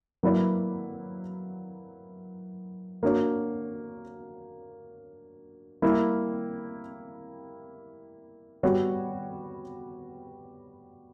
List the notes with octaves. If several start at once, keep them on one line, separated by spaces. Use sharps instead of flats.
F#3 A#3 E4 B4 D5
A#3 D4 F#4 C#5
G3 A#3 E4
G3 B3 F#4 C#5